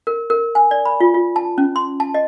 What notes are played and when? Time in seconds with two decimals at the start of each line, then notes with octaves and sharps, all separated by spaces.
0.07 A#4
0.30 A#4
0.55 G#5
0.71 D5
0.85 B5
1.01 F4
1.14 F4
1.36 A5
1.58 C#4
1.76 C6
2.00 A5
2.14 D#5